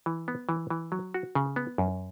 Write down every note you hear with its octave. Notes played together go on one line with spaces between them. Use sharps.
E3
B3
E3
E3
F#3
F#4
C#3
B3
F#2